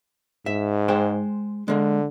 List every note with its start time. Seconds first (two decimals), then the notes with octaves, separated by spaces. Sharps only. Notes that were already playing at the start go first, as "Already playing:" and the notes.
0.46 G#2 E5
0.88 G#3 C5 G5
1.68 D3 G#3 A#3